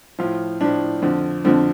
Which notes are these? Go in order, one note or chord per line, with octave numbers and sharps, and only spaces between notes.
A2 F3 F4
A2 F3 D4
F2 D3 F3
F2 D3 F3